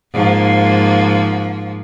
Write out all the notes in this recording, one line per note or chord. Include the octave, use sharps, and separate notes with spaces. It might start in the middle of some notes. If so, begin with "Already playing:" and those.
G#2 F3 A#3